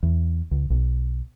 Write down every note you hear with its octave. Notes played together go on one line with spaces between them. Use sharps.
E2
C#2
B1